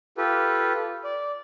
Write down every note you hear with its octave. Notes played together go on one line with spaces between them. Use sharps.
F4 G4 A4 B4
D5